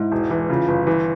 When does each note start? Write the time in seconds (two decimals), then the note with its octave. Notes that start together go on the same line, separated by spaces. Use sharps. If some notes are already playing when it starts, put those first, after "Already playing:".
Already playing: G#2 E4
0.12 E1
0.30 E3
0.50 C#3 F4
0.68 G1
0.87 E3